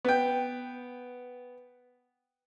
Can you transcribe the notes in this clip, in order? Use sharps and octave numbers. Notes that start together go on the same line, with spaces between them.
B3 G5